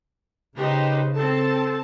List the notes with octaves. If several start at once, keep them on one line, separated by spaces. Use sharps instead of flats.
C#3 D#4 G4 B4 C5
C4 A4 A5